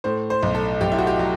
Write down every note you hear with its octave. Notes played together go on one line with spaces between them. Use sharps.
A2 C5
C5
B1
A4
B1 G4
E4
F#4
G4
F#3